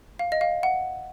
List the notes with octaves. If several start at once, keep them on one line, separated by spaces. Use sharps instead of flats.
F5
D#5
F5
F#5